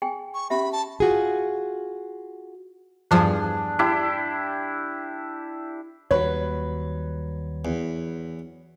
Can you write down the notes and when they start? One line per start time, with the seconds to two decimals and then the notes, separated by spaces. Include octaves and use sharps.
0.02 G#4 G5 G#5
0.34 C#6
0.50 C#4 G4 E5 B5
0.72 A5
1.00 F4 F#4 G#4
3.11 E2 G2 F3 D4 G#4
3.79 D4 E4 G4
6.11 D#2 F#3 G3 B4 C#5
7.65 E2